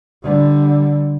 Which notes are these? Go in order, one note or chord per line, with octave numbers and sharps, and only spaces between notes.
D3 G3